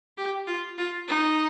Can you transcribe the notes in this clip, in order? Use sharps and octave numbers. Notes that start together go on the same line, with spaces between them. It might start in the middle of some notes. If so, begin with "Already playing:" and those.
G4
F4
F4
D#4